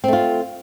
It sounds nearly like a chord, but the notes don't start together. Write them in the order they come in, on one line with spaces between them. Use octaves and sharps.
C4 A3 F4